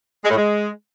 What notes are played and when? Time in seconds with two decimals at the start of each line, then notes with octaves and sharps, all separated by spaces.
0.23 G#3
0.30 A2
0.36 G#3